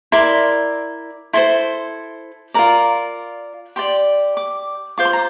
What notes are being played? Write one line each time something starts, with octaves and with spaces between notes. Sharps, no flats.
E4 A#4 D5 C6
E4 A4 C5 C6
F4 A#4 D5 A#5
G4 D5 C6
D6
F4 C5 D6
C6
A#5